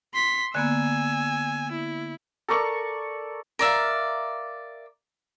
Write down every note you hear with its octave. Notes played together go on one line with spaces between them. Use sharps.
C6 B6
D3 A#3 B3 G#5 E6
E4
A4 A#4 D5 C#6
A#4 D5 E5 F5